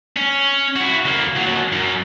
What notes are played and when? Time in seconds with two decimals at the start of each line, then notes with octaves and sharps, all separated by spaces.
0.17 C#4
0.76 E4 F#4
1.05 D2 A#3
1.37 D#2 F#3
1.72 F#2 F#3